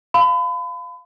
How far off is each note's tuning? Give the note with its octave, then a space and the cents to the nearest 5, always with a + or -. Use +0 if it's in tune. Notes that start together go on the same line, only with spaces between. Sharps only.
F5 +0 B5 +35